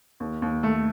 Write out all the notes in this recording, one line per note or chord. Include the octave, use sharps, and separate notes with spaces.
D#2
D#2
A3